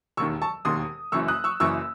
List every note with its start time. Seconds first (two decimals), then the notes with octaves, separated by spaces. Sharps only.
0.17 E1 D#2 D#3 C#6 E6
0.42 A5 C#6
0.65 E1 D#2 D#3 C6 D#6
1.12 F#1 F#2 E3 C#6 E6
1.28 D#6 F#6
1.44 C#6 E6
1.60 F#1 F#2 E3 C#6 E6